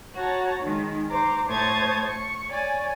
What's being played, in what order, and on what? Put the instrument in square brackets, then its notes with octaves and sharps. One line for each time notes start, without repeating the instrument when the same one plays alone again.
[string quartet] F#4 C#5 A5 A#5
D#3 G#3
C5 A#5 C6 D6
A2 C5 C#5 A5 D#6 G#6
C#6
C#5 D5 G#5